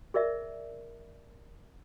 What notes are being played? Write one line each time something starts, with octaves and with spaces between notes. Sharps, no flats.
G#4 A#4 D5 E5